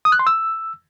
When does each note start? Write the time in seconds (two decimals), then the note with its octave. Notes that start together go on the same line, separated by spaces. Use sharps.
0.05 D#6
0.12 F#6
0.19 C6
0.27 E6